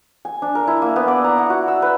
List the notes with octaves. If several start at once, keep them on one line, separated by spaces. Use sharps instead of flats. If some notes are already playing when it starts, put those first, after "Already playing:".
G#5
D4
A#4
E4
A#3
B3
D5
A#5
F#5
F#4
E6
B4